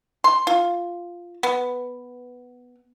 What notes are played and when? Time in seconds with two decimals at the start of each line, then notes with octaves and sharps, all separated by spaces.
0.24 C6
0.47 F4
1.43 B3